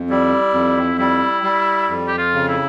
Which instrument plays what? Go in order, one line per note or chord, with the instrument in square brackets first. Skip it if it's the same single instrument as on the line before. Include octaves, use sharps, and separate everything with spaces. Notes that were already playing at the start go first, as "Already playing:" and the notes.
Already playing: [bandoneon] F2
[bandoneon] G3 [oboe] E4
[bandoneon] F2
[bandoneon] G3 [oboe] E4
[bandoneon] G3
F2
[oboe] G4
F4
[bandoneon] C#3
[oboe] E4